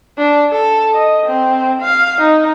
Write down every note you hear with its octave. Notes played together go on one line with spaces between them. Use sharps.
D4
A4
D#5
C4
F5
D#4